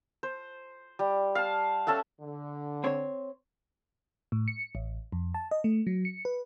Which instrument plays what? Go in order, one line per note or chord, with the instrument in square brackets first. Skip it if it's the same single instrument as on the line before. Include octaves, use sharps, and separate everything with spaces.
[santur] C5
G3
F5 A5
C#4 A4 E5 F#5
[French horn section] D3
[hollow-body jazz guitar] C4 C#5
[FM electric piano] A2
C#7
A1
F2
A5
D#5
A3
F#3
C#7
B4